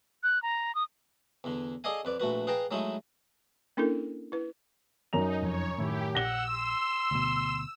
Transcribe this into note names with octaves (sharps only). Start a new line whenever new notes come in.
F#6
A#5
D#6
E2 D3
G#4 A4 D5 D#5 F5 G#5
F2 B4 D5
A#1 A3 F#4 B4
G#4 B4 F5 G5 A5 A#5
F#3 G#3 A3 D#4 E4
A#3 C#4 D4 E4 A4 A#4
E4 B4
F#2 D#4 A#5 F7
F1 F2 F3 C#5
A2 D#3 E4 G4
A#1 F#5 E6 A#6 E7 G7
C6
D2 B2